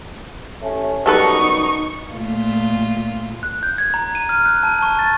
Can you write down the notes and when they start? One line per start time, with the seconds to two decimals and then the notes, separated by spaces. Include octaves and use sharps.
0.62 A1 A3 C#4
1.06 F#2 G3 B3 D#4 A4 B4 C#6
2.12 A#2 A3 F4
3.43 F#6
3.63 G6
3.78 G#6
3.94 A#5
4.15 D#7
4.29 F6
4.45 F#6
4.63 A5
4.82 C#6
4.99 A6